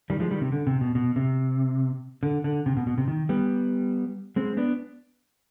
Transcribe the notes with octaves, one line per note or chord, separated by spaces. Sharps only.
D#3 G3
F3 G#3
D#3 G3
C3
D3
C3
B2
B2
C3
D3
D3
C3
B2
B2
C3
D#3
G3 B3
G#3 C4
B3 D4